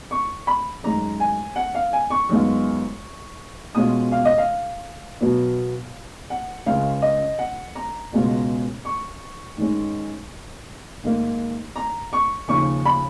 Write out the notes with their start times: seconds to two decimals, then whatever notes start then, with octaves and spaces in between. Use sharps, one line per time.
0.11 C#6
0.47 B5
0.83 F#2 D#3 G#3 A#5
1.20 G#5
1.56 F#5
1.75 F5
1.93 G#5
2.10 C#6
2.29 F#2 D#3 G#3 B3 F4
3.75 B2 G#3 C#4 F4 D#6
4.12 F5
4.25 D#5
4.38 F5
5.21 B2 F#3 B3
6.30 F#5
6.66 C#2 C#3 G#3 C#4 F4 F5
7.02 D#5
7.39 F#5
7.75 A#5
8.12 C#2 B2 G#3 C#4 F4
8.85 C#6
9.57 G#2 D#3 G#3 C#4
11.04 G#2 D#3 A#3
11.76 A#5
12.13 C#6
12.48 D#2 C#3 F3 C#6
12.85 B5